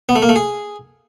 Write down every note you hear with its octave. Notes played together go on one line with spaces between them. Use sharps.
B3
A3
A#3
A3
G#4